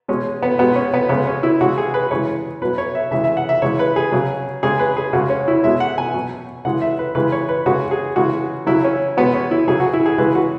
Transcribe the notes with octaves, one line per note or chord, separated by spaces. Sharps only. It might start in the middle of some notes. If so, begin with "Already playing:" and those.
B2 G#3 C#4
B3
B2 G#3 B3
C#4
B3
C#3 G#3 B3
C#4
E4
C#3 G#3 F#4
G#4
B4
C#3 E3 G#3 C#5
B2 F#3 B4
C#5
E5
C#3 E3 G#3 E5
E5
F#5
E5
C#3 E3 G#3 C#5
B4
G#4
C#3 F#3
C#3 G#3 G#4
B4
G#4
C#3 G#3 F#4
C#4
E4
B2 G#3 E5
F#5
G#5
B2 F#3
C#3 E3 G#3 F#5
E5
B4
C#3 E3 G#3 B4
C#5
B4
C#3 G#3 F#4
G#4
C#3 E3 G#3 F#4
C#3 F#3 E4
C#4
B2 G#3 B3
C#4
E4
C#3 F#3 G#4
F#4
E4
G#4
C#3 E3 G#3 B4
F#4